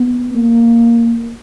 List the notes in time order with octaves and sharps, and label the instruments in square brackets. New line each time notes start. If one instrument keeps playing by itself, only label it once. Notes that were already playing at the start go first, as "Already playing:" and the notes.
Already playing: [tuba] B3
A#3